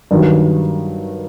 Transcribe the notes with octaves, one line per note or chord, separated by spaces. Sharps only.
G2 D#3 F#3